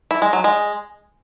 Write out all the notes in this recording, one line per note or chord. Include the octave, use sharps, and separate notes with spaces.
E4
G#3
F#3
G#3